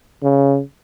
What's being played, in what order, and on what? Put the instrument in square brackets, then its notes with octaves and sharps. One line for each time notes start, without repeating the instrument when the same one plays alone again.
[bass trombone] C#3